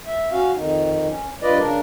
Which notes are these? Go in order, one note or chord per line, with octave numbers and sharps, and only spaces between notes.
E5
C#4 F#4 F5
F2 D#3 D#4
C#4
G2 F4 B4 D5 D#5
C#3 D4 A#4